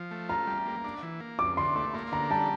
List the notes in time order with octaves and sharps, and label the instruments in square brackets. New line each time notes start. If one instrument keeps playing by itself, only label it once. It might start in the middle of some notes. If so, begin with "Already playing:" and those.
Already playing: [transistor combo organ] F3
A3
[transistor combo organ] F4 [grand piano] A#5
[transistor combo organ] G3
A#3
D4
E3
A#3
[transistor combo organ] F2 [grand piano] D6
[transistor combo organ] D3 [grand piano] C6
[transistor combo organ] A3 [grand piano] D6
[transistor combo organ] A#3 [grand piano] C6
[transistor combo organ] D3 [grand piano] A#5
[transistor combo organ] G3 [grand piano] A5